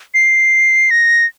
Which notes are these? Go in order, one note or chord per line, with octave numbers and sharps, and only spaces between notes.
C7
A#6